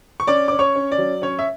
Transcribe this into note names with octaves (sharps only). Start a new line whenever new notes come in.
C#6
C#4 D5 D6
C#4 D6
C#5 C#6
C#4
D5
F#3
C#4 C#5
E5